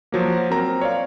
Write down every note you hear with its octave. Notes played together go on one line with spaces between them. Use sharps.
F3 F#3 A#3
C4 A#4 A#5
C#5 D5 F5